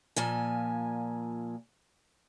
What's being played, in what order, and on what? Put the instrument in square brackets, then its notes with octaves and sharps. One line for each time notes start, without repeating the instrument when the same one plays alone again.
[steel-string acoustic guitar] A#2 F3 G#5